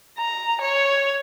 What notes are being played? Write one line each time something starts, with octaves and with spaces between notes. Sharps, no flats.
A#5
C#5